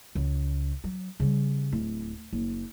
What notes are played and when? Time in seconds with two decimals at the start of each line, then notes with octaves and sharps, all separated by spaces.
0.15 C#2
0.84 F#3
1.20 C#3 G3
1.72 D1
2.33 F#1